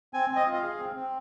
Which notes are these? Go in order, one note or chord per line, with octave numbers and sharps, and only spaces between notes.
C4 G#5
C4
D#5
F4
D#5
F5
G#4
C4
C4